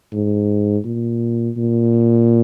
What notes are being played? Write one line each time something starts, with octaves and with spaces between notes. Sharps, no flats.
G#2
A#2
A#2